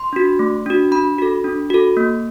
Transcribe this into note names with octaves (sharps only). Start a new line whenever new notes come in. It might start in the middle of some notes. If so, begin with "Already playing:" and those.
Already playing: C6
D4 F#4
A3
D4 F#4
D4 B5
F#4 A4
D4
F#4 A4
A#3